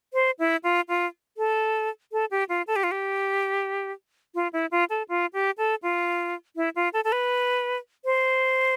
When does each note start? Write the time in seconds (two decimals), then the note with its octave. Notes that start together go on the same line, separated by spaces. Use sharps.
0.13 C5
0.39 E4
0.64 F4
0.89 F4
1.37 A4
2.12 A4
2.31 G4
2.49 F4
2.67 A4
2.76 G4
2.84 F4
2.91 G4
4.35 F4
4.53 E4
4.71 F4
4.90 A4
5.09 F4
5.33 G4
5.58 A4
5.83 F4
6.56 E4
6.76 F4
6.93 A4
7.04 A4
7.12 B4
8.05 C5